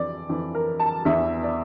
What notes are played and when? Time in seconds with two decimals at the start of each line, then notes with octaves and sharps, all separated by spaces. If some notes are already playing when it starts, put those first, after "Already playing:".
Already playing: F2 E3 D5
0.29 F2 E3
0.55 A#4
0.80 A5
1.05 E2 E3 E5
1.43 D5